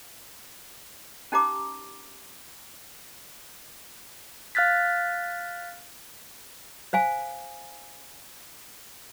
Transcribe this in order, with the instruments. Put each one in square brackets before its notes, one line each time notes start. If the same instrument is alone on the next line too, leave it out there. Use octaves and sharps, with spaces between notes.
[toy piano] C#4 D#4 G4 A#5 D6
[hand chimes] F5 F6 F#6 A6 B6
[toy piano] C5 F5 G#5